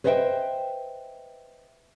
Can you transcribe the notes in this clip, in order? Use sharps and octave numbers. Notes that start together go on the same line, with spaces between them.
B4 C5 D#5 E5 F#5 G5